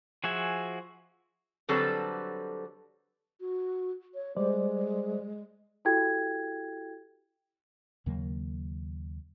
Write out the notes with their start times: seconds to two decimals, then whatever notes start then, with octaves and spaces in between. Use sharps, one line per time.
0.24 F3 F#4 G#4 E5 G#5
1.69 D3 F#3 G3 C4 A4 B4
3.40 F#4
4.14 C#5
4.37 G3 G#3 C5 D5
5.85 E4 F#4 G4 A4 G5 G#6
8.06 D#2 C#3 F#3 A#3